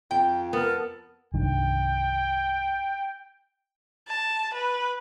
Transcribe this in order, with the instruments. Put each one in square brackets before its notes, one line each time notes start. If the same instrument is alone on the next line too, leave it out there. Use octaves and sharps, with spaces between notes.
[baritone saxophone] F2 [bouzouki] G5
[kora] B3 [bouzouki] A4 [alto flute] A#4
[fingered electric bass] C2 G2 D#3 [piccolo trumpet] G5
[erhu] A5
B4